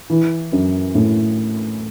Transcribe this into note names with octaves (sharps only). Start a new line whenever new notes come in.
E3
F#2
A2